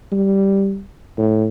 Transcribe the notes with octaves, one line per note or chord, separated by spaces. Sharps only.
G3
A2